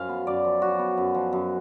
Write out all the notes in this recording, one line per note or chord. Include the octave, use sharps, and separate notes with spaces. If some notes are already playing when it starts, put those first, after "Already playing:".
Already playing: F#2 F3 F5 G#5
B3
F#2 D5
F3
F#2 F#4
B3
F#2
F3
F#2